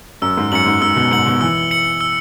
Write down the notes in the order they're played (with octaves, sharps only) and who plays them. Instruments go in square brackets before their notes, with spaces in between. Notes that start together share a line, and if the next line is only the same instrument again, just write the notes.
[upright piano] F#2 [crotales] E6
[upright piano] G#2
[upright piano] F#2 [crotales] C#7 F#7
[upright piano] G#2
[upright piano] G#2 [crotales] E6
[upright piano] B2
[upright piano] G#2 [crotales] C#7 F#7
[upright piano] B2
[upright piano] E3 [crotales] E6
[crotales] C#7 F#7
E6